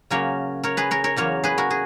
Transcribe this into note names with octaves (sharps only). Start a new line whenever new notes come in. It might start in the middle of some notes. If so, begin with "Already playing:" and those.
C#3 F#3 A#3 C#4 A#4 C#5
A#4 C#5
G#4 B4
A#4 C#5
A#4 C#5
E2 C#3 F#3 A#3 A#4 C#5
G#4 B4
F#4 A#4
G#4